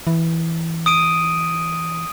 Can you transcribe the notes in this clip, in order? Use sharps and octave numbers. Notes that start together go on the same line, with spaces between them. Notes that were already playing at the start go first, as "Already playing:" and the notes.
E3
D#6 D7 D#7